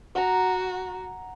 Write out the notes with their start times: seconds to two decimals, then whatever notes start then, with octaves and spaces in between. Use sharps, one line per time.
0.15 F#4 F#5 A#5